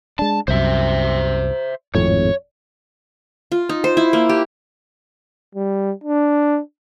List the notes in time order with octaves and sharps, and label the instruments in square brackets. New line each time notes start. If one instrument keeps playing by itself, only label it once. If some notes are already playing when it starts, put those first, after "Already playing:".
[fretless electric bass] G#3 D4 [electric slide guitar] A5
[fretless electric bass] C2 F#2 [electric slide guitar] C5 E5
[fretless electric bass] G#1 F2 A2 [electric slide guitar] C#5
[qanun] F4
D#4
C5
E4
A#3
G4
[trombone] G3
D4